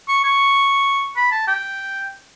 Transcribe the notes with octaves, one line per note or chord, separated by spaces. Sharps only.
C#6
C#6
B5
A5
G5